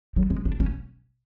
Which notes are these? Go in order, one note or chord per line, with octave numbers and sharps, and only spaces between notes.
F#3
G#3
D4
C#4